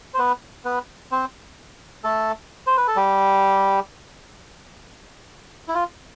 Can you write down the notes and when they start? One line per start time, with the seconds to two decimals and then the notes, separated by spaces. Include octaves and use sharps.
0.14 C5
0.18 B3 B4
0.65 B3 B4
1.11 C4 C5
2.04 A3 A4
2.67 C5
2.77 B4
2.87 A4
2.96 G3 G4
5.68 E4
5.74 F4